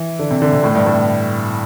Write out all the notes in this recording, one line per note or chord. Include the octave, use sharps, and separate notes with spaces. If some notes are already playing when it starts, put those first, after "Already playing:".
Already playing: E3
D3
C3
D3
C3
A2
G2
A2